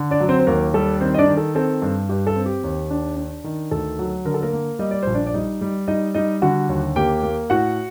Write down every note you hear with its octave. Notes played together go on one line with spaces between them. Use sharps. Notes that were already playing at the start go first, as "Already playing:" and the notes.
Already playing: D3
D4 D5
F#3
C4 C5
C5
D#2 A#3 A#4
G3 A4
D#3 C4 C5
D#5
D4 D5
D#3
A4
C4 A4
G2
G2 G4
A4
C4
G4
D#2
D4
D4
D#3
D2 A4
F#3
D3 A#4
A4
A#3 A#4
A#3
G3 D#5
D5
A#1 C5
D4 D5
D5
G3 D#4 D#5
G3
G3 D#4 D#5
G3 D#4 D#5
D3 F#4 F#5
D#2
A#3 G4 G5
A#3
A2 F#4 F#5